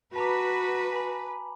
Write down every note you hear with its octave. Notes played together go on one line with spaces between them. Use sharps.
F#4 B4 A5 A#5 D6
G#5 B5